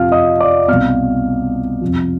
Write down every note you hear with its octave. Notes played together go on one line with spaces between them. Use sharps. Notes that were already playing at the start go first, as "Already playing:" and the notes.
Already playing: F2 C3 F3 F5 F6
D#5 D#6
D5 D6
C2 B2 F5 F6
F2 C3 F3